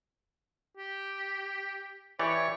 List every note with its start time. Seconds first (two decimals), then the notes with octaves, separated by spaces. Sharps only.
0.77 G4
2.19 E3 G4 C#5 D5